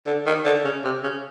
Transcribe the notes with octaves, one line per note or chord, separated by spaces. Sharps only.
D3
D#3
D3
C#3
C3
C#3